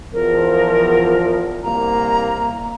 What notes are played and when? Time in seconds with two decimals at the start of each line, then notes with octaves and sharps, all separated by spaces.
0.13 E2 F3 A#4
1.63 C2 A#3 A#5